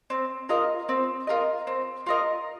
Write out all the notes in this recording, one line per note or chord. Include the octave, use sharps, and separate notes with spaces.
C4
F4 A#4 D#5
C4
F4 A#4 D#5
C4
F4 A#4 D#5